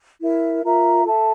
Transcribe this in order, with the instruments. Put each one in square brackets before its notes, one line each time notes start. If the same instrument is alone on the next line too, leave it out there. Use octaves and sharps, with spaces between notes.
[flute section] E4 A#4 E5
F4 A#4 E5 A#5
A4 E5 A5